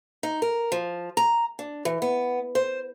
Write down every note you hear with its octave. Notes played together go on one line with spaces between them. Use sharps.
D#4
A#4
F3
A#5
D4
E3
B3
C5